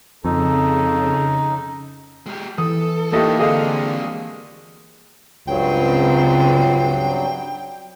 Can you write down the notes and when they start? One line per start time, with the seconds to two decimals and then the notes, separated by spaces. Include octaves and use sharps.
0.25 F2 C#3 D#4 A4
2.26 G#3 G4
2.58 E3 A4 D#6
3.12 A2 A#3 D#4 F4 G4 A4 D#5 E5
3.40 D3 G#3 C4 G#4 D#5 F5
5.48 C#2 G2 C#3 F#3 C4 C5 G5